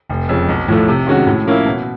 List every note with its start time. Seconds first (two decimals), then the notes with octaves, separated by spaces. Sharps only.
0.10 F1
0.29 F2 C#3
0.49 B1
0.68 A2 F3 A3
0.88 C3
1.07 D#3 G#3 C#4 F#4
1.27 A2
1.46 F3 A#3 C#4 E4
1.66 B2